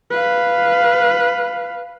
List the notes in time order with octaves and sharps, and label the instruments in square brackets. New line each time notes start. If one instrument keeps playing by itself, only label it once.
[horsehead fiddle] B4 F5